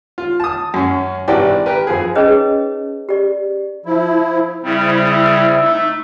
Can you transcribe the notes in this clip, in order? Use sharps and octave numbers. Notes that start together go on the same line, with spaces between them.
F4
A5 D#6
F#2 C#4
G#1 C3 E3 F#4 D5 G5
G4 A#4 B4
F2 G#4
C#4 D#4 G#4 B4 C#5 D#5
G4 D5
F3 E4
C#3 G3 C4 E4
E5
A3 D#4